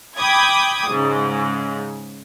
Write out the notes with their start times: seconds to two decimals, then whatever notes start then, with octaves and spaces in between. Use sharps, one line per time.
0.18 G5 B5 D6 D#6 G#6
0.89 G#2 C#3